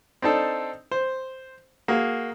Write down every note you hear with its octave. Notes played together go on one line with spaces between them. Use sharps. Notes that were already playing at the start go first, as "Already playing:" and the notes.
C4 D4 D#4 A4
C5
A#3 F#4 G#4